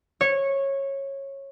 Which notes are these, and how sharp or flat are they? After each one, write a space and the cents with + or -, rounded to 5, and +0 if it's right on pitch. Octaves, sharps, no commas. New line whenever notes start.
C#5 -15